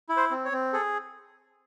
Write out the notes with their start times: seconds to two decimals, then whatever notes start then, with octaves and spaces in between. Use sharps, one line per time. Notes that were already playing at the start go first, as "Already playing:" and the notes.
0.09 E4
0.17 C5
0.31 C4
0.45 C#5
0.52 C4
0.73 G#4 A4